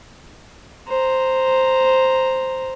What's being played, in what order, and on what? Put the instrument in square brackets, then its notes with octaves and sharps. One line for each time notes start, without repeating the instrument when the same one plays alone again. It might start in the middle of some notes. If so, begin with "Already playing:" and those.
[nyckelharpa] C5 A#5